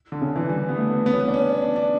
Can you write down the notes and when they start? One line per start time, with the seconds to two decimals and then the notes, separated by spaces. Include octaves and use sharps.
0.12 D3
0.22 C#3
0.36 E3
0.49 G3
0.69 B3
0.77 A3
1.06 B3
1.13 C#4
1.21 B3
1.28 D4
1.34 C#4
1.62 D4
1.76 D4